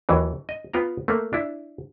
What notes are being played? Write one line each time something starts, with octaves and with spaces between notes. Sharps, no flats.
D#2 E3 F#3
D#5
B3 F4 G5 A#5
A3 A#3
D4 E4